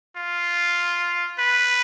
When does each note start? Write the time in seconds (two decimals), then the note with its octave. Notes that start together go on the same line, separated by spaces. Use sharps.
0.16 F4
1.39 B4